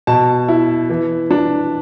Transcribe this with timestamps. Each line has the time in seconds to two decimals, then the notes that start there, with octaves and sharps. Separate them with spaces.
0.07 B2 A5
0.48 E4
0.90 E3
1.31 D4